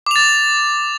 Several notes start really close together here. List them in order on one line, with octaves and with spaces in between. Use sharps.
D6 F7 A6